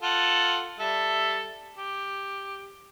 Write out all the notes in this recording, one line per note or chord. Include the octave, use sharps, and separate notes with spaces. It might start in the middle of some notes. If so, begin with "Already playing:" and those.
F4 A4 F#5
G3 A4 E5
G4